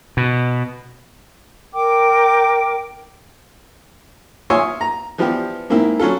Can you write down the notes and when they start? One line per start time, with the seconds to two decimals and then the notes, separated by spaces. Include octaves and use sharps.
0.17 B2
1.72 A#4 G5 D6
4.50 F4 C#5 E5 G#5 C6 D#6
4.81 A#5
5.18 E3 F3 G3 B3 F4 G4
5.70 G#2 A#3 C4 E4
6.00 F#3 C#4 F4 A4